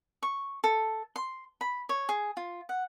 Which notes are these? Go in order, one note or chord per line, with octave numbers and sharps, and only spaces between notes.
C#6
A4
C6
B5
C#5
G#4
F4
F#5